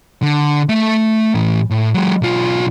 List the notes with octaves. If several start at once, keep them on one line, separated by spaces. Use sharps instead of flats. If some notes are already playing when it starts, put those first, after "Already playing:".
D3
A3 E5
A2 E3
A2
F#3 G#3
B1 F4